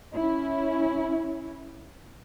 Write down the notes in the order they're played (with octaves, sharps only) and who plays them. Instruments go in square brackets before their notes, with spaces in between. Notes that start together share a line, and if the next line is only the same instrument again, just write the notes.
[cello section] C#4 E4